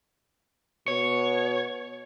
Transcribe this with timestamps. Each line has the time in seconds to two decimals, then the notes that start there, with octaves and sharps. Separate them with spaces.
0.88 B2 C#5